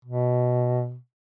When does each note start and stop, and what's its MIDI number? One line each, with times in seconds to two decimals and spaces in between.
0.05 0.96 47